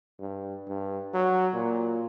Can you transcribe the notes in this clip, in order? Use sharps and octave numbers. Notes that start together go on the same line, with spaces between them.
G2
G2
F#3
A#2